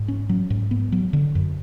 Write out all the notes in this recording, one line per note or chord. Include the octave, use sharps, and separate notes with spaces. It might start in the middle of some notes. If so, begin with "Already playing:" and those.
Already playing: G#2
C#4
F#3
G#2
B3
F#3
D3
F#2